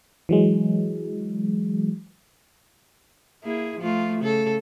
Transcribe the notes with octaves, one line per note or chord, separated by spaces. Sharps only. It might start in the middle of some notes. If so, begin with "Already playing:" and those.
E3 F#3 G#3
A#3 E4 G#4
F3 A3 F4
C#3 A4